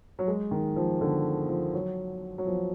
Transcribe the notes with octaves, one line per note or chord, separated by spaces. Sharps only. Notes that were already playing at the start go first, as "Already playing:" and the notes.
F#3
G#3
D#3
F3
D3
F3
F#3
F#3
F3